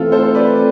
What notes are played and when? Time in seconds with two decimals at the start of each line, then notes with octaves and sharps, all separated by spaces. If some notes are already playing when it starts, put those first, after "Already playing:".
Already playing: E3 A3 C4 F4 A4
0.12 A4 C5
0.35 B4 D5